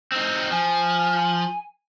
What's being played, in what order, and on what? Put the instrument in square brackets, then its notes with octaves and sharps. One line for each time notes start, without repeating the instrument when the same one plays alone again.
[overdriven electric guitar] C4 D#4
[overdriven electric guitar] F3 [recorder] G#5